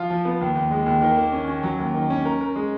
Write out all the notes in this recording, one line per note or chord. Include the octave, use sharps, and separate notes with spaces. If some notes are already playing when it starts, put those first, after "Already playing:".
Already playing: F3 F4
F3
B3
D#2
D#2
G#3
D#2
D#3
A#3
C#4
C#4
F#3
D#2
D#3
C#4
A#4
A#4
G#3